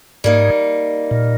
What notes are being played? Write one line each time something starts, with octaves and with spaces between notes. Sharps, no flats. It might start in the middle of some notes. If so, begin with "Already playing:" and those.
G#2 G3 A#3 D#4
A#2